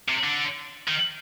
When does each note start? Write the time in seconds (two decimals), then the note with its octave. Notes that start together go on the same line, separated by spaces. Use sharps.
0.08 C3
0.23 D3
0.88 D#3